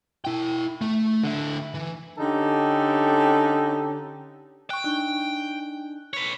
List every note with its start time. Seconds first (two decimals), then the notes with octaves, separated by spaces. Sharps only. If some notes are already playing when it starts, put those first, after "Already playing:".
0.25 E4 G5
0.81 A3
1.24 D3 E4
1.74 E3
2.18 D3 C#4 D#4 G4 A4
4.70 G5 C#6 F#6
4.84 D4 D#4 F#6
6.13 B4 C#5